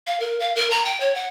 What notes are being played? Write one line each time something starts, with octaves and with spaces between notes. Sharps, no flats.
F5
A#4
F5
A#4
A#5
G5
C#5
F#5